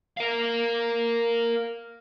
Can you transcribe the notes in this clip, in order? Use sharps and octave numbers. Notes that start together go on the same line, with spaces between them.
A#4 F5